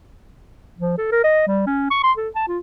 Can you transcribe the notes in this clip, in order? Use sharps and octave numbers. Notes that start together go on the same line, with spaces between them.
F3
A4
A#4
D#5
G3
C#4
C#6
C6
A4
A5
F4